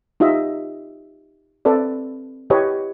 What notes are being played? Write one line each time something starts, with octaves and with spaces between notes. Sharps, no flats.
D#4 F4 G4 D#5 E5
C4 A4 B4 D5
E4 G4 B4 C#5 D#5